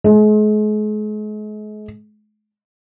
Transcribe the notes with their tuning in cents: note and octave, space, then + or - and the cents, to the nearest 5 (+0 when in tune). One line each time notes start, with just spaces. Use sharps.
G#3 +40